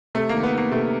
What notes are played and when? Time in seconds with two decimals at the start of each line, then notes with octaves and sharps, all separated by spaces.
0.15 C3 A3
0.29 D#3 A#3
0.43 B3
0.53 D#3 A#3
0.72 C3 A3